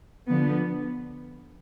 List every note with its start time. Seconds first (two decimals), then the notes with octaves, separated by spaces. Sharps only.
0.29 D3 F3 B3